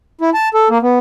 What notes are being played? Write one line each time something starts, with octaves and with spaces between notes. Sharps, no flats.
E4
A5
A4
A#3
B3